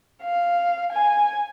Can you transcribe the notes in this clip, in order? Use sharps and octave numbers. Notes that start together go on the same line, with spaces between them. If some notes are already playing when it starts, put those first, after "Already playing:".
F5
G#5